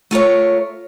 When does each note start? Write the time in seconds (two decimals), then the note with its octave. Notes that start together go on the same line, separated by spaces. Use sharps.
0.11 A3 F4 A#4 C#5